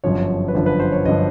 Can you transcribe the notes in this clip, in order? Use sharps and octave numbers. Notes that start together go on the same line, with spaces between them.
G1 F#2 D3 F3 C#5
B4
G1 F#2 D3 F3 C5
B4
C5
C#5
G1 D3 F3 D#5